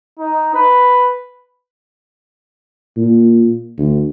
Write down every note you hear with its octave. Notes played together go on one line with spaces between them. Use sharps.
D#4
B4
A#2
D2